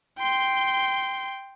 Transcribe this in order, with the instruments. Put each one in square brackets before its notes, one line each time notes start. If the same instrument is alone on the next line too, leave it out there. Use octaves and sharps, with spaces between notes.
[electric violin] G5 C6